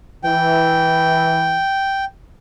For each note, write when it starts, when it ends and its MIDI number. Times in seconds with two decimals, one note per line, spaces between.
0.24 1.63 52
0.24 2.05 79